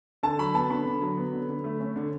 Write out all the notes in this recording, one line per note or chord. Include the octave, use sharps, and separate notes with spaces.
D3 A5
F#3 B5
B3 A5
D3 B5
D3
F#3
B3
D3
D3
A3
C#4
D3